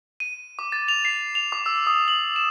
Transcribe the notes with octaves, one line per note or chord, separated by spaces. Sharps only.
D#7
D6
A6
F7
C7
F7
D6
E6
D#6
F#7
E7